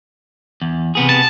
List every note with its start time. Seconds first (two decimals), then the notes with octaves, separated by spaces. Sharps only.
0.62 E2
0.95 C3 B3 G#4
1.10 A5